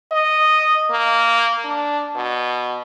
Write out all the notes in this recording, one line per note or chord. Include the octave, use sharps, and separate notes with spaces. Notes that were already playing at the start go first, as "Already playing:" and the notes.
D#5
A#3
D4
B2